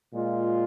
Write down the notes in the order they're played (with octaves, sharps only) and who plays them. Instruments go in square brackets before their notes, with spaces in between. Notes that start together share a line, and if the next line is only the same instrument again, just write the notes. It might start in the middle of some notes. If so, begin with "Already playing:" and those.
[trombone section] A#2 G#3 F4